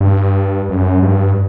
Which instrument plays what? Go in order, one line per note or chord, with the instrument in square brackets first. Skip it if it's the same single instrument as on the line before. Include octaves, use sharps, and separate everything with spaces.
[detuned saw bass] G2
F#2
G2